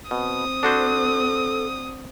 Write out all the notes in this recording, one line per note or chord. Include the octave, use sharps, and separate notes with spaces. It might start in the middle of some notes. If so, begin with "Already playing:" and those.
B2 C4 D#6
D4 F#4 A4 C5